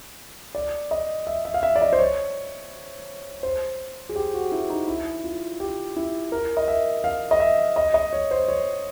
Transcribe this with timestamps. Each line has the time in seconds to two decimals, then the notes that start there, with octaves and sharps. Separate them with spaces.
0.55 D5
0.91 D#5
1.27 E5
1.45 E5
1.54 F5
1.63 E5
1.76 D5
1.81 D#5
1.93 C5
1.99 C#5
3.43 C5
4.09 G#4
4.16 G4
4.33 F#4
4.52 E4
4.70 D#4
4.88 E4
5.24 F4
5.60 G4
5.96 E4
6.32 A#4
6.57 D#5
6.68 E5
7.04 F5
7.31 D#5
7.40 E5
7.76 D#5
7.94 D#5
8.13 C#5
8.31 C5
8.48 C#5